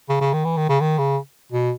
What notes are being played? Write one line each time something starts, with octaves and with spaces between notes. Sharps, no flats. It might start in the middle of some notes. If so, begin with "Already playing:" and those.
C#3
C#3
D#3
E3
D#3
C#3
D#3
C#3
B2